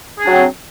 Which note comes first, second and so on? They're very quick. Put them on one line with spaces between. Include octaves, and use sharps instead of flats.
G#4 D4 F#3 C4